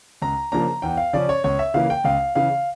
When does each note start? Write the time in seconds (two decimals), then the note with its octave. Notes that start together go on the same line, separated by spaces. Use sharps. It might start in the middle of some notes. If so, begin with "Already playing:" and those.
0.22 C#2 A#5
0.52 C#3 F3 A#3 D4 A#5
0.82 E2 G5
0.97 F5
1.13 C#3 F3 C#4 D5
1.29 C#5
1.44 C#2 C#5
1.59 E5
1.74 C#3 E3 A#3 F5
1.90 G5
2.04 C#2 F5
2.35 C#3 E3 F5